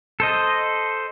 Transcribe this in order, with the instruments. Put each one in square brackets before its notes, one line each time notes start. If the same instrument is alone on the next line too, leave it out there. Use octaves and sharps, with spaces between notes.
[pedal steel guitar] A4 C5 D#5